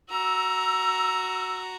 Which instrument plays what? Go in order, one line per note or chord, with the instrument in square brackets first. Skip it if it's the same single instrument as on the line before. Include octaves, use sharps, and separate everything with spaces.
[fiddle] F#4 A#5 [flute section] E6